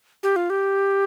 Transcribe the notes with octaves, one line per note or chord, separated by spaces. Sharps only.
G4
F4
G4